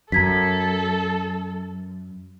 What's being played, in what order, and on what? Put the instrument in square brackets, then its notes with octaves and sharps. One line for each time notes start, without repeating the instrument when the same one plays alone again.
[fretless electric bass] F#2 [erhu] A4 [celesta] A#5 G#6 B6